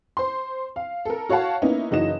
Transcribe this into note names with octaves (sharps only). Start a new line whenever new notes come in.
C5 C6
F5
A4 A#4
F#4 C#5 F5 F#5 A5
A#3 B3 C#4 D#4 E4
F#1 E3 D#4 F#4 D#5 E7